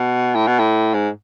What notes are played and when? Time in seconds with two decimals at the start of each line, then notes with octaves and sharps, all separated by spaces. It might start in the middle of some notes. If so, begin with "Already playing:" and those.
Already playing: B2
0.35 A2
0.47 B2
0.59 A2
0.94 G#2